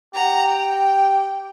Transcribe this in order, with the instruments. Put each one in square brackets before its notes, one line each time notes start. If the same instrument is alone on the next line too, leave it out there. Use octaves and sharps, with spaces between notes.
[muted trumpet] G4 [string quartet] F#5 A#5
[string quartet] G5